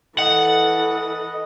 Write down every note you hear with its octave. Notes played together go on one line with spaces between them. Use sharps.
E3 A4 D#5 F#5